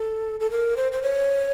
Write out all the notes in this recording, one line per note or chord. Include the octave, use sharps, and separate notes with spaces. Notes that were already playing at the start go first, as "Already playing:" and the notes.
Already playing: A4
A4
A#4
C5
C5
C#5